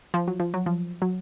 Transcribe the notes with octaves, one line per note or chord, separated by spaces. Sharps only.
F3
F#3
F3
F#3
F3
F#3